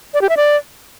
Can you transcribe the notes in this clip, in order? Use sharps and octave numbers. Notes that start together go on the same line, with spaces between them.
D5
G4
E5
D5